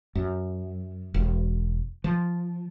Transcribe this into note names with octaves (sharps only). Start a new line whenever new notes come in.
F#2
E1
F3